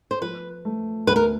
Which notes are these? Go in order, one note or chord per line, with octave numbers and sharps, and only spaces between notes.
C5
F3 B4
A3
D2 B4
A#4